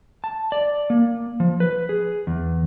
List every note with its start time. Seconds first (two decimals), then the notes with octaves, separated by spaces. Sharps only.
0.24 A5
0.52 D5
0.90 A#3
1.40 F3
1.60 B4
1.89 G#4
2.27 E2